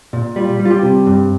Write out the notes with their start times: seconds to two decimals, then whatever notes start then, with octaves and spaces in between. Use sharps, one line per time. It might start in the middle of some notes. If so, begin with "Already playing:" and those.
0.13 A#2
0.36 G3 F4
0.59 G3
0.65 F4
0.71 G4
0.83 C3
1.06 G2